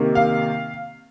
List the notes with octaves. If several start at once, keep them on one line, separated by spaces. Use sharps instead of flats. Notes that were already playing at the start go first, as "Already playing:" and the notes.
Already playing: C3 D#3 A#3
F5